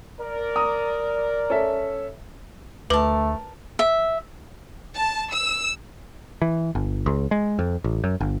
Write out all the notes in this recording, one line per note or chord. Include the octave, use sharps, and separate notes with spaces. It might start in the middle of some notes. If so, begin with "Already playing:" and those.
A#4 D5
A#5 D#6
C#4 A4 E5
D2 A3 A#4 B4 A5 D6
E5
A5
E6
E3
G1
C#2
G#3
F2
A1
F#2
G1